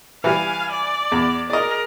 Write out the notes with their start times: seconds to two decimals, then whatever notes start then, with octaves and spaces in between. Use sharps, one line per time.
0.24 E3 G3 F5 G#5
0.71 D5
1.12 E2
1.50 G#4 A#4 D5 D#5